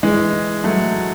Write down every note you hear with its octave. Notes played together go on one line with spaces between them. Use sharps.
E3 G#3
F#3 A3